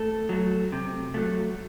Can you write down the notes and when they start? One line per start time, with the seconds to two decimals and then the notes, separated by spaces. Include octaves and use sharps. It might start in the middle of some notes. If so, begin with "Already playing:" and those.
Already playing: A3 A4
0.29 F#3 A3
0.72 C3
1.14 F#3 A3